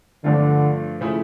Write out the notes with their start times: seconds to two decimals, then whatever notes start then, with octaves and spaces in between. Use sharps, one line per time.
0.24 G2 D3 F3 A3 D4 F4
1.01 C#3 F3 A3 E4